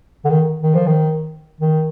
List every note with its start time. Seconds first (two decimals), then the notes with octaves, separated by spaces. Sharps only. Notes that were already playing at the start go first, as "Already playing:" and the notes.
0.25 D3
0.30 D#3
0.63 D#3
0.75 F3
0.87 D#3
1.61 D#3